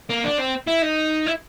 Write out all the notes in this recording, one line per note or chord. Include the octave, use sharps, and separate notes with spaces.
A#3
D4
C4
E4
D#4
E4